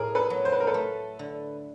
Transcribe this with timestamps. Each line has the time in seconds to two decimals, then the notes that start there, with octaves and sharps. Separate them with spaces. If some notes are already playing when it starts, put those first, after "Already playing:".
Already playing: A2 G#4 A#4
0.15 A4 B4
0.30 F#3
0.45 C5
0.52 B4
0.60 A#4
0.67 A4 B4
0.74 A3
1.19 D3